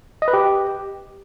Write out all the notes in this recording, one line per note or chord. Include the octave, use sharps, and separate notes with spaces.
D#5
B4
G4